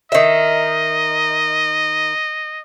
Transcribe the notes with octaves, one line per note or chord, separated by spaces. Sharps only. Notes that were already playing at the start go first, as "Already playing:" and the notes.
D#3 D#5 E5